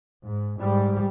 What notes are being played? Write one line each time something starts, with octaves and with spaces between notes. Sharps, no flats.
G#2
G#2 G3